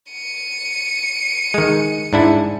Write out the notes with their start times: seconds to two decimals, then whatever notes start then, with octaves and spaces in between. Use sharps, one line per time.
0.12 C#7 D#7
1.54 D#3 G#3
2.13 G#2 D4 E4